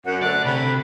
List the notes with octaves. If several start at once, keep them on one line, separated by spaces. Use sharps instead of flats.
F#2 F#5
D2 D3 D5 F#6
C3 B5